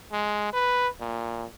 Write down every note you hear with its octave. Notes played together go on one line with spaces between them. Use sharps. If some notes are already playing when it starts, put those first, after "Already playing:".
G#3
B4
A#2